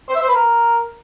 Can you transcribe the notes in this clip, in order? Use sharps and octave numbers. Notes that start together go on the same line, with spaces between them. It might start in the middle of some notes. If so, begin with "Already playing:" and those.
C5
E5
C5
B4
A#4